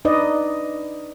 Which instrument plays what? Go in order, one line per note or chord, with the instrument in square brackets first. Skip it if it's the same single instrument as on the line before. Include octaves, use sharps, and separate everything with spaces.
[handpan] D4 D#4 B4 D5 D#5